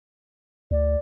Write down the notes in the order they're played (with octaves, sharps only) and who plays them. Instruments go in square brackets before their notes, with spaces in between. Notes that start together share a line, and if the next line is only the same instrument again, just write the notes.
[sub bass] D2 [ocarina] D5